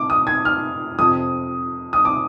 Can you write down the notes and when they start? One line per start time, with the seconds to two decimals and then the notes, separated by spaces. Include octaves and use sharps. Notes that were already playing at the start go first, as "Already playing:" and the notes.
Already playing: D6
0.10 D#6
0.27 G#6
0.45 F6
0.98 F2 C3 F3 D#6
1.93 D#6
2.05 D6